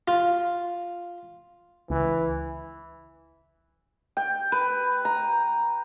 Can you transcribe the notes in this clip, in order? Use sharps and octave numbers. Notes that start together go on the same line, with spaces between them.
F4
C#2 E3
G5
B4
A#5